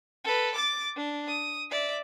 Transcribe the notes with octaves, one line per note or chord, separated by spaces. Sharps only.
A4 B4
D6 A6
D4
D#6
D5 E5